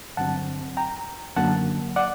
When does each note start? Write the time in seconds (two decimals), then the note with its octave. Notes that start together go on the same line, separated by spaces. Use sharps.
0.17 G2 D3 F#3 C4 F#5 A5
0.77 G5 A#5
1.36 F#2 D3 F#3 A#3 F#5 A5
1.96 D5 F#5